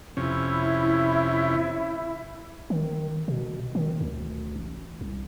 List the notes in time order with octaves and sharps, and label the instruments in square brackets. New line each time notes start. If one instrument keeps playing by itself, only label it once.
[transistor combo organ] F2 C3 C#4 [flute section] E4
[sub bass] D#3
B2
D#3
D2
A1
C2